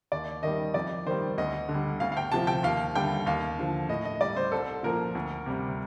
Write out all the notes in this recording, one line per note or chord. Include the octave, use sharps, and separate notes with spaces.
D#2 D5
D#3 G3 D#5
F2 D5
D#3 G3 C5
D2 D#5
D3
G3
D2 F5
F5
G5
C3 F3 A5
G5
D#2 F5
D3 G3 G5
D#2 F5
D3 F3
A2 D#5
D#5
G3 D5
C5
C2 A4
A#2 F3 A#4
D2
C3 G3